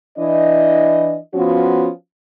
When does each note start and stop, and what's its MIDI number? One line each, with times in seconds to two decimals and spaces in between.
0.19 1.18 52
0.19 1.18 62
0.19 1.18 64
0.19 1.18 75
1.35 1.89 53
1.35 1.89 59
1.35 1.89 61
1.35 1.89 65
1.35 1.89 66